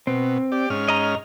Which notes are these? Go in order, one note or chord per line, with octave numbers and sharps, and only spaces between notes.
B2 C4
G4 D5
G#2 C#4 F6
D#5 A#5